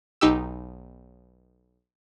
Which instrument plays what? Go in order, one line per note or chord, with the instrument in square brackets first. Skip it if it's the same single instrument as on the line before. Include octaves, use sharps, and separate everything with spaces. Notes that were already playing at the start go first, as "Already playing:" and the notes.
[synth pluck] B1 D#4 G4 E6